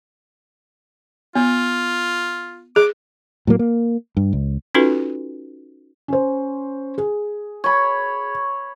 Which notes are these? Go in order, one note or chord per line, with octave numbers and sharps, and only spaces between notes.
B3 F4
G#4 D6
A2 F#3 A#3
A#3
G2
C#2
C#4 D#4 F4 F#4 A4 B4
C#4 C5
G#4
C#5 B5